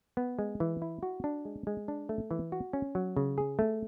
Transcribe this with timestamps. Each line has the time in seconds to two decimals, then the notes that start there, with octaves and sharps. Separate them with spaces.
0.17 B3
0.39 G#3
0.60 E3
0.82 E4
1.03 F#4
1.24 D4
1.45 G#3
1.67 G#3
1.88 D4
2.09 A3
2.31 E3
2.52 F#4
2.73 C#4
2.95 F#3
3.17 C#3
3.38 G#4
3.59 A3